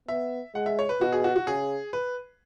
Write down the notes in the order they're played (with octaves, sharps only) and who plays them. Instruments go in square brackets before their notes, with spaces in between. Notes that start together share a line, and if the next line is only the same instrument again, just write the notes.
[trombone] B3 [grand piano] E5
[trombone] G#3 [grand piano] F#5
[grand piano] E5
C#5
B4
[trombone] B2 [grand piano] F#4
[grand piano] G#4
F#4
F#4
[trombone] C#3 [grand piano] G#4
[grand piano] B4